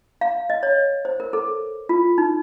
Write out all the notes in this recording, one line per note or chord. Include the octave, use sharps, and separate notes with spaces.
F5
D#5
C#5
C5
A#4
A4
F4
D#4